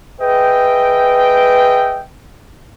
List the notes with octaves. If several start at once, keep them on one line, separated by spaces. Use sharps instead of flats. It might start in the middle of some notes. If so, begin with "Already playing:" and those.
G#4 B4 D#5 E5 G5